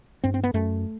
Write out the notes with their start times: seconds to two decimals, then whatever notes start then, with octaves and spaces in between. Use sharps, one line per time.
0.24 G2 C4
0.34 C4
0.44 B3
0.54 F#2 A3